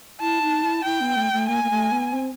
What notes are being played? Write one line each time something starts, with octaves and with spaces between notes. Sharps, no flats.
E4 A5
D#4
E4
E4 G5
B3
A3
A3
A#3 G#5
A#3
A3
B3
C4